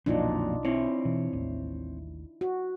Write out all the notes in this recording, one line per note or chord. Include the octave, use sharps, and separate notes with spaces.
B1 F2 A#2 F#3 D4 D#4 F4
C4 E4 C#5
B2 E3
A1 D#2 A2
F#4